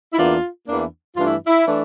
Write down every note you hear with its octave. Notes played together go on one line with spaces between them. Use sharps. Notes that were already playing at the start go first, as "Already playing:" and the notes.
E4
E2 E3 A#3 D4 F4
E2 E3 A#3 D4
G2 E3 A3 D4 F4
E4
E4
E3 A3 D4